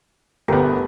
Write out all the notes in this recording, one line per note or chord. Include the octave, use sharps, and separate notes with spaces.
G1 A3 B3 G4 A#4